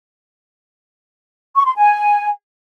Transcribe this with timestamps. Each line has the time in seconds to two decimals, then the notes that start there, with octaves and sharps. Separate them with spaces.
1.56 C#6
1.66 C6
1.77 G#5